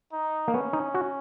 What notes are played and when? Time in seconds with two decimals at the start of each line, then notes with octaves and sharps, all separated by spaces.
0.13 D#4
0.48 A#3
0.54 B3 C#4
0.73 D#4
0.94 F#4